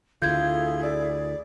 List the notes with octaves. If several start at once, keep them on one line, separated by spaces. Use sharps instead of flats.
D2 D3 E4 F4 G#4 A4 G6 G#6
D5